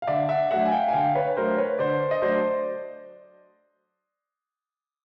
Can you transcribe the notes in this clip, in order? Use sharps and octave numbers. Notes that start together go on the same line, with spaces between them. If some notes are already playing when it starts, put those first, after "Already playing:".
F5
D3 D5 E5
E5 F#5
F#3 A3 D4 E5 F#5
G#5
F5 G5
G#5
D3 F5 G5
B4 C#5
F#3 A3 D4 A#4 C5
B4 C#5
D3 C5 D5
D#5
F#3 A3 D4 C5 D5